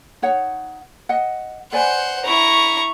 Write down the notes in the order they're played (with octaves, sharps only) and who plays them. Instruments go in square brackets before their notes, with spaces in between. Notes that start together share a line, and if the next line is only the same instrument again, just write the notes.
[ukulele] D#4 C#5 F#5
D#5 F#5
[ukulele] B4 D5 G#5 [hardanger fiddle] C5 F#5
[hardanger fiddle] E4 [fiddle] A#5 C#6